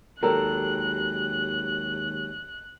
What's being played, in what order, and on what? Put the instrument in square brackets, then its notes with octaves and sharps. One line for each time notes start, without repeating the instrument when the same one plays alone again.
[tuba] D#2 [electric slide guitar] F#3 G#3 G4 [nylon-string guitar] A4 A#4 [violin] F#6